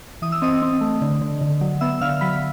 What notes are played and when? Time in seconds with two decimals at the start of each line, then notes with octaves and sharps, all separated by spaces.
0.22 E3 D#6
0.32 E6
0.42 C4 D#5 D#6
0.62 C4
0.81 A3
1.02 D3
1.21 D3
1.41 D3
1.61 F#3
1.81 B3 E5 E6
2.01 D3 F5 F6
2.21 F#3 B5 B6